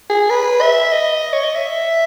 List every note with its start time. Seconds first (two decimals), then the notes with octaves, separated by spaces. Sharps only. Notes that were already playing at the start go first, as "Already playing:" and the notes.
0.10 G#4
0.30 B4
0.61 E5
0.92 D#5
1.33 C#5
1.44 D#5
1.55 E5